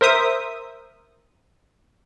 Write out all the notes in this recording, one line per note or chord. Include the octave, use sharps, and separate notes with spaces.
A#4 C5 E5 D#6